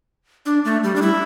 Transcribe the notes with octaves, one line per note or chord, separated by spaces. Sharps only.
D4
A3
G3
D4
E4